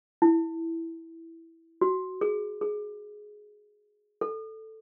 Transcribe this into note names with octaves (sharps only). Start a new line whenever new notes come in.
E4
F#4
G#4
G#4
A4